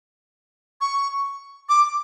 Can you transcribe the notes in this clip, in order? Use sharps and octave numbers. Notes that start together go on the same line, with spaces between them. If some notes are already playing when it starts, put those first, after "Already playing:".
C#6
D6